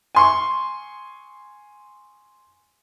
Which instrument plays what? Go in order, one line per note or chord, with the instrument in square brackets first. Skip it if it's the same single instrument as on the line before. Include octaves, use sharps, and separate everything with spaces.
[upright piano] G#5 C6 C#6